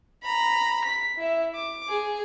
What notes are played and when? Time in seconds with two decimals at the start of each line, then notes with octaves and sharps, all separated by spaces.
0.23 A#5 B5
0.85 B6
1.18 E4 E5
1.55 D6
1.89 G#4